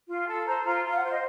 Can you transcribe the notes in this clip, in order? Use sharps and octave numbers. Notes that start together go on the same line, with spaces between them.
F4
A4
C5 A#5
F4 A#5
F4 F5
F#5
C5
D#5